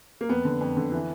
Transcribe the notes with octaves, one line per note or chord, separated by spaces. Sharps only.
A#3
F2 B3
D3
F2
D3
E3